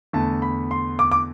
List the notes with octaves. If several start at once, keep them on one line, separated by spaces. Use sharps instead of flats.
E2 D3 A3 A5
B5
C6
D6
D6